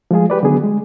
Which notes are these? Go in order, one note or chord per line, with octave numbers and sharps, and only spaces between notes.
F3 G#3 F4 G#4
G4 B4 D5
D3 D#3 F#3 B3 G#4
G#3